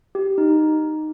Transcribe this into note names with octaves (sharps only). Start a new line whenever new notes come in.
G4
D#4